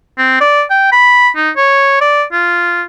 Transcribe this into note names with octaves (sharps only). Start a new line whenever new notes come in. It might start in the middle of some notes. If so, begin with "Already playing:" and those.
C4
D5
G5
B5
D#4
C#5
D5
F4